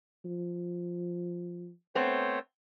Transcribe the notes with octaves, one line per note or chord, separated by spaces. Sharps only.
F3
A3 B3 C4 C5 C#5